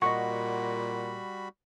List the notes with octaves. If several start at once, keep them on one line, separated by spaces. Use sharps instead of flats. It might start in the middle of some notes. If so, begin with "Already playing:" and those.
A#2 G3 F#4 D#5 F#5 B5 C#6